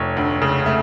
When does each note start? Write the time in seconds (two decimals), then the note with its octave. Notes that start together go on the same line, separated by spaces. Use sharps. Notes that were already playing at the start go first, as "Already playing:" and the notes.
Already playing: F1 C#5
0.17 D2
0.42 C#3
0.66 A3